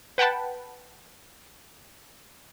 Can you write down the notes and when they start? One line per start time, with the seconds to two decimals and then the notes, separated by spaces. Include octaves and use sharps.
0.18 B4 F#5 G5 A5 B5